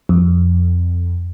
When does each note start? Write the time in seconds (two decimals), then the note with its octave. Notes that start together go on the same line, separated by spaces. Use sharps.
0.09 F2